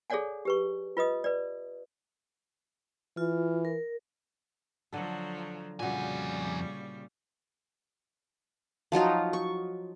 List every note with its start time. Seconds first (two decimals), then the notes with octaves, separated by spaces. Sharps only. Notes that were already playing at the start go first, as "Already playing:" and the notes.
0.10 G#4 A4 C#5 D5 F#5 G#5
0.45 G4 B4 C#6
0.97 F4 B4 D#5 D#6
1.24 B4 D5
3.17 E3 F4
3.65 A#4
4.93 D3 F3 F#3 A4
5.80 F2 A#2 C#3 G3 F#4 G#5
8.92 F3 F#3 D#4 F4
9.33 C#6